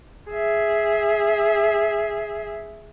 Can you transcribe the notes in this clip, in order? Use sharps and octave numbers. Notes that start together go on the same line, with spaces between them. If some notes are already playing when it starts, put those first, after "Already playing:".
G#4 E5